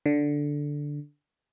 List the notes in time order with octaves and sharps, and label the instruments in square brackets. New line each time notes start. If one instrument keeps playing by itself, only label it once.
[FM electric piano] D3